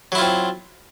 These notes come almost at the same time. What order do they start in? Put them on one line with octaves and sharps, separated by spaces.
F#3 E4 F4 C4